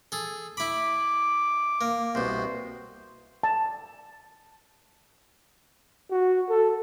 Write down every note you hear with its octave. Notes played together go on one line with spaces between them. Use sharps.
G#4 A4
E4 B5 D6
A#3
C2 B2 C5
A5
F#4
A4